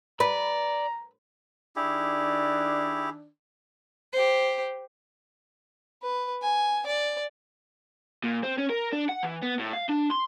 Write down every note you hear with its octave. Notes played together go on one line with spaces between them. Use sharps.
B4 D5 A#5
D#3 D4 E4 G4 G#4
G4 C5
B4
G#5
D5
A#2
C4
C#4
A#4
D4
F#5
E3
B3
A2
F5
D4
C6